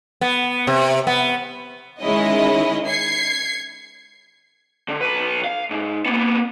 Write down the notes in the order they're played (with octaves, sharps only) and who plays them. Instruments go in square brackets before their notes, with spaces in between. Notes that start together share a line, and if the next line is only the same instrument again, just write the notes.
[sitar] B3
C3
B3
[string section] D#3 G#3 C#4 E4 D#5
G#6 C7 C#7
[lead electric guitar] D3
B1 B4
F5
G#2
A#3 B3